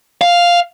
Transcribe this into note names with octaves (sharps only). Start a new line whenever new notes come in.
F5